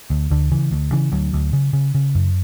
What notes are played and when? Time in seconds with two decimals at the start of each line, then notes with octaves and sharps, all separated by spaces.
0.10 D2
0.31 D2 D3
0.51 C#3 E3
0.71 D2
0.92 C#3 E3
1.12 D2 F#3
1.33 D2
1.53 C#3
1.73 C#3
1.95 C#3
2.15 F#2